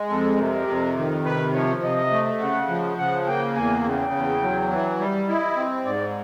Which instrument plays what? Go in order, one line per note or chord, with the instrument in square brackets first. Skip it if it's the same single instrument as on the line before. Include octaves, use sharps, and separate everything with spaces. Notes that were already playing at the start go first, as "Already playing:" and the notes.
Already playing: [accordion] G#3
[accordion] F2 [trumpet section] A4
[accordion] C3 [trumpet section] A#4
[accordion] F2
D#3
[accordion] C3 [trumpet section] B4
[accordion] F3 [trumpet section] C#5
[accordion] C3 [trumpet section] D#5
[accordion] A3
[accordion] C#3 [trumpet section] F#5
[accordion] F3
[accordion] C#3 [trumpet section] F#5
[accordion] A#3 [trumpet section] G5
[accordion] E2 [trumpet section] G#5
[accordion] C#3 [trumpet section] G5
[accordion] E2
F#3
E3
G3
[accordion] E4 [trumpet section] D#5
[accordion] C4
[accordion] G#2 [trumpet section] D5